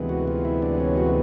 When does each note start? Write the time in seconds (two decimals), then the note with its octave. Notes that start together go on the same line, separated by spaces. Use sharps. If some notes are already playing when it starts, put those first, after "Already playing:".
Already playing: D2 C3 E3 G#3 B3
0.09 F#4
0.27 F4
0.45 E4
0.62 D4
0.80 C#4
0.97 F#4